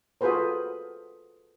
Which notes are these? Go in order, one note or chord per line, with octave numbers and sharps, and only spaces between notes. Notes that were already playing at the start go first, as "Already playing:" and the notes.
F4 F#4 G#4 A4 B4 C5